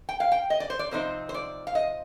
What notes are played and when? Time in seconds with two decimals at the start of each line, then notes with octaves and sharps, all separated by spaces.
0.09 G5
0.20 F5
0.32 G5
0.50 D#5
0.60 D5
0.70 C5
0.79 D5
0.91 C3 F3 C4 D#4 C5
1.29 C5
1.34 D5
1.67 F5
1.75 D#5